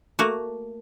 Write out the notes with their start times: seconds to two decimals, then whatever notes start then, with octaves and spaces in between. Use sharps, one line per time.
0.19 A3 A#3 F#4